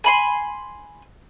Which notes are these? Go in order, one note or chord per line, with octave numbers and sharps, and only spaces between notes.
G#5 B5 C6